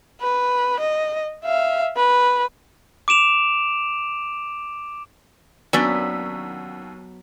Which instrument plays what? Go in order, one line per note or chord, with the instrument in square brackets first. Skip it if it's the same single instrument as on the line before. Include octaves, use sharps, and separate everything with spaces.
[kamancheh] B4
D#5
E5 F5
B4
[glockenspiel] D6 D7 E7 F7
[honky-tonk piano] D#2 E6 B6 [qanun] F#3 B3 [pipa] C#4 D4